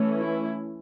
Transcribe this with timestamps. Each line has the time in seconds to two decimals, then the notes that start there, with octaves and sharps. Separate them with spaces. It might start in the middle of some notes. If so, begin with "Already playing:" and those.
Already playing: E3 A3 C#4
0.19 E4